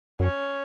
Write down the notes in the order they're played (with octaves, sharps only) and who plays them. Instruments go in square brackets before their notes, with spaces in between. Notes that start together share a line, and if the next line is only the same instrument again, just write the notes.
[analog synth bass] F#2 [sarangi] C#4